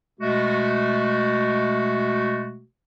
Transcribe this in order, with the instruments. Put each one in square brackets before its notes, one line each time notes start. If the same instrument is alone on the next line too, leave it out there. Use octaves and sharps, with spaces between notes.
[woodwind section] B2 G#3 A3 F#4